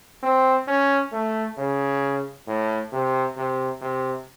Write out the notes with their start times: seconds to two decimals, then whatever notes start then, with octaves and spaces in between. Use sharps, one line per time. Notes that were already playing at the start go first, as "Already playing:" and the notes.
0.23 C4
0.68 C#4
1.13 A3
1.58 C#3
2.47 A2
2.92 C3
3.37 C3
3.82 C3